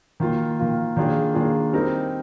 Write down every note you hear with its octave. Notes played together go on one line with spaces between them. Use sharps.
D#3 A#3 F4
D#3 A#3 F4
D#3 A#3 D4 F4 G#4
D#3 A#3 D4 F4 G#4
G3 C4 D#4 A#4